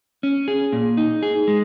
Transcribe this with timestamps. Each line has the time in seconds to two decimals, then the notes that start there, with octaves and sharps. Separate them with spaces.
0.23 C#4
0.48 G#4
0.72 A#2
0.97 D#4
1.23 G#4
1.47 G#3